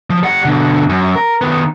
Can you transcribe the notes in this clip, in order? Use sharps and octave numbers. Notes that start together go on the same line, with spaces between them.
F3
G3 F#5
B2 D3
F#2
A#4
D#3 B3